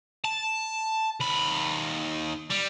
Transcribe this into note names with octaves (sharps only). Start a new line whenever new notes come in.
A5
D#2 B5
G3